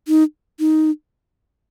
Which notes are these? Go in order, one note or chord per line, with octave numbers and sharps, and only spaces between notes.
D#4
D#4